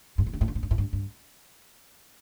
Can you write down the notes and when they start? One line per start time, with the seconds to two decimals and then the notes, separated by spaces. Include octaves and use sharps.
0.18 G2
0.26 A2
0.33 G2
0.41 A2
0.48 G2
0.55 A2
0.63 G2
0.71 A2
0.78 G2
0.93 G2